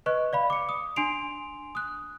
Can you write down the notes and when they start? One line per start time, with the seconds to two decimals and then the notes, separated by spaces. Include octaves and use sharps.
0.06 B4 D#5 C#6 F#6
0.33 D5 F5 B5
0.50 D6 C#7
0.69 D#6
0.96 D4 G#5 C6 C7 D7 F7
1.75 D#6 F#6